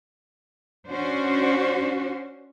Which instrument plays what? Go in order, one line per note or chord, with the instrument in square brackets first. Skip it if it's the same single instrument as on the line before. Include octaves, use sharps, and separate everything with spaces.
[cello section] C#4 D4 F#4 C5